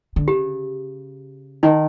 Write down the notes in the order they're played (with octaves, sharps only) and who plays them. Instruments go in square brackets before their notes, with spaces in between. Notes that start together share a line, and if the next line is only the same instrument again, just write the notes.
[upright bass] D3
[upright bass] C#3 [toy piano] G4
[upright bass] D#3 [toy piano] D#4